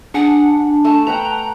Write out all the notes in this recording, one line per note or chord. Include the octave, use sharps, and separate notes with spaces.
D4 G#4 F#5
A3 A5
B4 F#5 G5 A#5